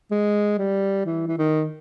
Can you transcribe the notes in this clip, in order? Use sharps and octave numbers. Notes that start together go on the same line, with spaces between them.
G#3
G3
E3
E3
D#3